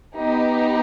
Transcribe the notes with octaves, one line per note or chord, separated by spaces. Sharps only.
B3 D#4 G4